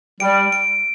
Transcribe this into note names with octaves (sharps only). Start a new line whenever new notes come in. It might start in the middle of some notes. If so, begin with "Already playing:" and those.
G3 D7
D7